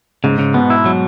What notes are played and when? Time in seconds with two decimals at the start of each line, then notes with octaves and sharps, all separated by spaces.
0.24 G#2 C#3
0.39 C#3
0.54 B2 B3
0.70 E4
0.86 F#3